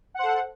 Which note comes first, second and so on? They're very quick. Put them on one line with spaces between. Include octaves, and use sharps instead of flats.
F#5 C5 A4